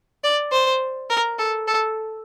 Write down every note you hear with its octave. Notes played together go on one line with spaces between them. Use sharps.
D5
C5
A#4
A4
A4